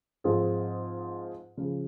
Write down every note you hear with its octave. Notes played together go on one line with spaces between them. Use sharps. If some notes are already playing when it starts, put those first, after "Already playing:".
G#2 F3 C4 F4 G#4
C#3 F3 G#3